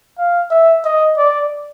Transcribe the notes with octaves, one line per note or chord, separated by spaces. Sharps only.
F5
E5
D#5
D5